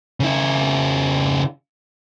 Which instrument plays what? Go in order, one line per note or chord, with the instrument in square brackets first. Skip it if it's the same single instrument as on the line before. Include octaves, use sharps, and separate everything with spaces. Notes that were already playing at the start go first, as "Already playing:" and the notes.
[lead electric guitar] C#3 E4